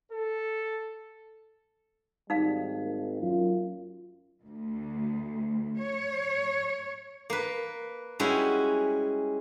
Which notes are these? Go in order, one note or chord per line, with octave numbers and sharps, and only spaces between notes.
A4
G#1 G3 D#4 F5
A#3
F#2 F4
D2
C#5
A#3 B4
G3 G#3 C#4 E4 F#4